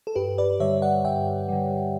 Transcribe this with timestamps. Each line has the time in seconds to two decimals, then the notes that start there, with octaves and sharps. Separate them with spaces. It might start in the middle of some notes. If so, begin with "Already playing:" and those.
0.07 A4
0.15 G2 G4 B4
0.38 B4 D5
0.60 D3 G3 C#5 E5
0.82 D5 F#5
1.05 G2 E5 G5
1.48 D3 G3